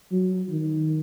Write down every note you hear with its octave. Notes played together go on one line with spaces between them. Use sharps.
F#3
D#3